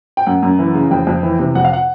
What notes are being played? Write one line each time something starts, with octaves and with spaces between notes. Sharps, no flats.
G5
F#2 F#5
F#2
E3
C#3
F2 G5
F2
E3
C3
F2 F#5
F5
F#5